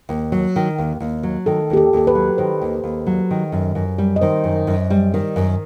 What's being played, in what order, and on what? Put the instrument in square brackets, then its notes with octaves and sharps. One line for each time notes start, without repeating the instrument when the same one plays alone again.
[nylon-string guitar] D#2
F#3
D#3
D#2
D#2
F#3
[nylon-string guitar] D#3 [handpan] A4
[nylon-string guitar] D#2 [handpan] G4
[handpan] A4
[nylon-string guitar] D#2 [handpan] A4
[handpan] B4
[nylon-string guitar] F#3
[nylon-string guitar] D#3 [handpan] C5
[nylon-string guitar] D#2
D#2
F#3
D#3
F#2
F#2
G3
[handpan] D#5
[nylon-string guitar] D#3 [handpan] C5
[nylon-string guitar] F#2
F#2
G3
D#3
F#2